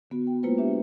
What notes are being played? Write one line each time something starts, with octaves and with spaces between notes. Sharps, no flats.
D3 B3 F#4
G5
G#3 A#3 E4 F4 B4 C5
D4 G4 E5